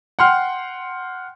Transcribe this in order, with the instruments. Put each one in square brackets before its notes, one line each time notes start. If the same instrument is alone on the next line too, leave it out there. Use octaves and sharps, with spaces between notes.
[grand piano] F#5 G5 C6 F6